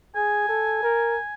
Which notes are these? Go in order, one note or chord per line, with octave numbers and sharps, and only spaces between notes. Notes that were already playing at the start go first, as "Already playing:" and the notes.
G#4 G#5
A4
A#4